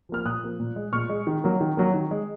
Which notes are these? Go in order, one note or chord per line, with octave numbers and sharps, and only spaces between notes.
F3 A#3 F6
A#2 D#6 F#6
F3 A#3
A#2
G#3
A#2 C#6 F6
G#3
D#3
F#3 A#3
D#3
F#3 A#3
D#3
G#3